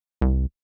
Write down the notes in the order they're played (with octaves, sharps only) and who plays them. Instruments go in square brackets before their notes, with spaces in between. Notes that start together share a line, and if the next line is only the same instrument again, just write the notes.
[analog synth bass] C2